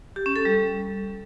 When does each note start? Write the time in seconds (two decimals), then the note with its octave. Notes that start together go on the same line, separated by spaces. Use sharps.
0.16 G4
0.26 C#4
0.36 A4
0.45 G3